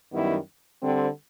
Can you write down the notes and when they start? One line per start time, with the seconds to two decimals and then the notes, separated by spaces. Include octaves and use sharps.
0.12 F#2 D#3 G3 B3 E4
0.82 D3 G3 C4